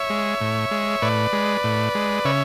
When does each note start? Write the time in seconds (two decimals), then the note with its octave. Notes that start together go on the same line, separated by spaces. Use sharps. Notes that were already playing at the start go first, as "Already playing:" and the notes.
Already playing: C#5 E5
0.10 G#3
0.41 A2
0.71 G#3
1.02 A2 B4 D5
1.33 G#3
1.64 A2
1.95 G#3
2.25 C#3 C#5 E5